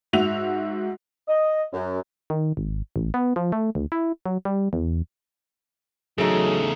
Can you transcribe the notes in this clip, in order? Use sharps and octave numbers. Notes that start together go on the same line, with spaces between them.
G#2 F#4 E5 F7
D#5
F#2
D#3
G#1
A1
B3
F3
A3
D2
E4
F#3
G3
E2
E2 C#3 F#3 A3 D#4 G#4 A4